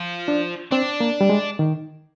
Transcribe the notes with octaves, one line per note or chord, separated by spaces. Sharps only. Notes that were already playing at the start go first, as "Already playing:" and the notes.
Already playing: F3
D4
C4 D4
A#3
G3
G#3
D#3